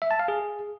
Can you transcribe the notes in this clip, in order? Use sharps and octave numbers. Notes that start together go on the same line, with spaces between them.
E5
A5
F5
G#4